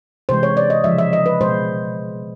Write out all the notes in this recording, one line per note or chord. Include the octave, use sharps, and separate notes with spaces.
C3 E3 G#3 C5
C#5
D5
D#5
C#3 F3 G#3 E5
E5
D#5
B4
B2 G#3 C5